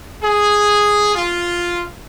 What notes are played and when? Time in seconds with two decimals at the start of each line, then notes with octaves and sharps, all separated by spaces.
0.23 G#4
1.16 F4